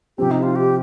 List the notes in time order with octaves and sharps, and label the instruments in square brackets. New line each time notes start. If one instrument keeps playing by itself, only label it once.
[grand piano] C3 F3 C4 [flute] G4
[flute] D#4
F4
G4